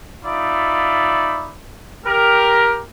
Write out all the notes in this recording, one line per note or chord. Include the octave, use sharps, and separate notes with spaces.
D#4 F4 D5 E5 B5
G4 A#4